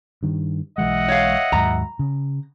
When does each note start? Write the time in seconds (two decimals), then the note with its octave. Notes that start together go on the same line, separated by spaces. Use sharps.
0.23 G2 D#3
0.78 B1 E3 G#3 D#5 E5 F#5
1.08 C#5 F5
1.52 D#2 G#2 F#3 A#5
1.99 C#3